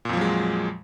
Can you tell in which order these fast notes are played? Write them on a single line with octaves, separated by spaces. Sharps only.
A#2 F2 F3 F#3 G#3